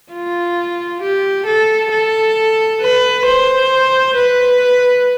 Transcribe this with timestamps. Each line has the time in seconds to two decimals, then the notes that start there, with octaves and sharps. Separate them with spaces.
0.12 F4
1.02 G4
1.47 A4
1.92 A4
2.81 B4
3.26 C5
4.16 B4